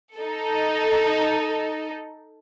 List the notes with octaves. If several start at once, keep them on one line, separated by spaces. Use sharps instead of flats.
D#4 A4